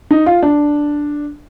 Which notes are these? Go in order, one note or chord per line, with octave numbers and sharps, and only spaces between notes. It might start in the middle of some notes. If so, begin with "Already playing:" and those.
D#4
F4
D4